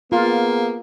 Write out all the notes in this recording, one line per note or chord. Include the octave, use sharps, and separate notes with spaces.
A#3 B3 F4 G#4